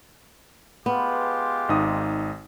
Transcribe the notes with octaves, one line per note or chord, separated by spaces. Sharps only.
G#3 B3 F4 G4
G#1 D#4 D#6